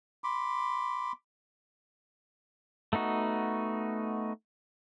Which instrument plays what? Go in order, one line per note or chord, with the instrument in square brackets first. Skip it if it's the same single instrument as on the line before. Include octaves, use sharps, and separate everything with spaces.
[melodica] B5 C6 D6
[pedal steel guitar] A3 B3 D#4 F#4